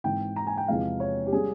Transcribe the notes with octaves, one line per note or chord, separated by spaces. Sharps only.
G#1 G#2 E3 G5
A#5
G#5
G5
E2 C3 F3 G#3 F5
C#5
G4
G3 C#4 G#4